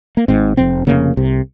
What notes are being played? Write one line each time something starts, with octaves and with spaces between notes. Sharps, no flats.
A#3
G#1 G#2 C4
F1 F2 C3 C4
F1 D#2 C#3 A#3
C2 C3